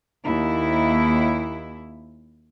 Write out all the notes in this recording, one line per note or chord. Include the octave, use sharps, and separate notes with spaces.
D#2 E4